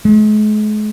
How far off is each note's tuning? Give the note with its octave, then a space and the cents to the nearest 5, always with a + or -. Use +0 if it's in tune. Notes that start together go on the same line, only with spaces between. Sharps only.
G#3 +40